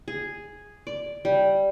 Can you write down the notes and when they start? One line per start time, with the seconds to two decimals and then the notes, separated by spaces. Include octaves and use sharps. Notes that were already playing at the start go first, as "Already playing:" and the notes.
0.08 G#4
0.87 D5
1.25 G3